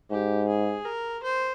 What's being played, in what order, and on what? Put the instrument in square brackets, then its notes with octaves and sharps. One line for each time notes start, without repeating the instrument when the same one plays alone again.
[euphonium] G#2 [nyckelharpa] G4
[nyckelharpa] G#4
A#4
C5